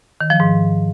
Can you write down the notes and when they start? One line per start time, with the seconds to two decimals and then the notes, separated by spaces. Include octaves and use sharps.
0.21 D#3
0.30 F3
0.40 G#2